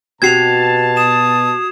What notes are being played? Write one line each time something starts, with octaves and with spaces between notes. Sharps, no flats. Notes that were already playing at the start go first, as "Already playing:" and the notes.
B2 C4 F#4 G4 A5 G#6 C7 F7
D#6 E7